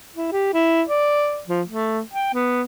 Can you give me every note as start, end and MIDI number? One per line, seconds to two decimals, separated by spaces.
0.15 0.32 64
0.32 0.49 67
0.54 0.83 64
0.88 1.42 74
1.48 1.62 53
1.68 2.01 57
2.14 2.33 79
2.34 2.63 59